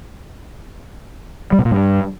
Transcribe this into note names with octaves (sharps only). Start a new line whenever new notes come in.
G3
B2
A#2
G2